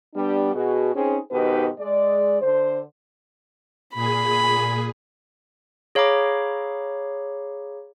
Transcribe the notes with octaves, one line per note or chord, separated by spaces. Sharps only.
G3 B3 D4
B2 F#4 G#4
C4 C#4 D#4 G#4
G#2 B2 D#3 D#4 G4 B4
G#3 D5
D3 C5
A#2 G#4 B5
G#4 C#5 F5 A#5 B5 D6